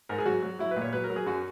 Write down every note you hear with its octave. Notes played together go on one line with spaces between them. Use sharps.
G#2 A#4
G#4
F#3 F#4
F#3
F#3 E4
B4
A#2
C#5
F#3 B4
A#4
F#3
G#4
F#2 F#4